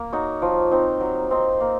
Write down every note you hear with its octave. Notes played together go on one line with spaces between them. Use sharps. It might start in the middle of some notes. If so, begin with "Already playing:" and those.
Already playing: A#3 A#4
D#4 F#4 C#5
F3
C4 D#4
F#3
C4 D#4
A#3